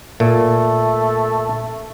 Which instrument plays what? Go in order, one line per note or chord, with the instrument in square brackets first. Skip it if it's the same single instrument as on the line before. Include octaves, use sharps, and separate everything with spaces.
[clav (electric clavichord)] A#2 [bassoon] A3